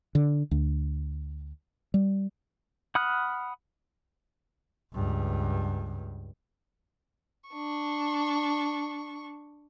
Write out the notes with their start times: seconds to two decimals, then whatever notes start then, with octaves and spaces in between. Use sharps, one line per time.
0.15 D3
0.51 D2
1.94 G3
2.95 F#5 B5 D#6 F6 F#6
4.94 C#2 G2
7.50 D4 C#6